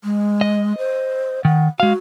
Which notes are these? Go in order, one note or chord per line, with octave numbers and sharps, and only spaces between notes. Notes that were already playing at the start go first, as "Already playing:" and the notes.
G#3
D#5
C5
D#3 F#5
G#3 F#4 F5